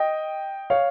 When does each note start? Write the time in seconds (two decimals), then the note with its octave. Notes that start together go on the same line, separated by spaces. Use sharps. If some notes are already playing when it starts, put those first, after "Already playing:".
Already playing: D#5 G5
0.70 C#5 F5